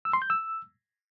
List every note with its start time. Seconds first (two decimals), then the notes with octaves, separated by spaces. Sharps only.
0.05 E6
0.13 C6
0.22 G6
0.30 E6